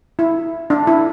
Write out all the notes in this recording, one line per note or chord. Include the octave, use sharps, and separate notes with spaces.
E4
D4
E4